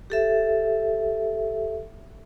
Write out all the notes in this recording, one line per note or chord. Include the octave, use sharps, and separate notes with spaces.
G4 A4 E5